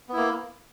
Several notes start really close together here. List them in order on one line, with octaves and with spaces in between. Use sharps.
B3 E4 A#3